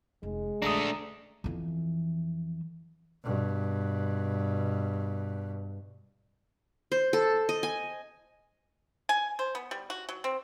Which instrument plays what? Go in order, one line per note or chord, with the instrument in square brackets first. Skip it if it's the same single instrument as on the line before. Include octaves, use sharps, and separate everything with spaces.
[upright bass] F1 [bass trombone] G#3
[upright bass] A#1 [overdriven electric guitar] A3 D4 [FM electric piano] A#5 D#6
[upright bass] F2 E3
[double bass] G2 B2
[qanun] C5
A4
D#5
G#5
[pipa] G#5
C5
B3
G3
F#4
F#3
C4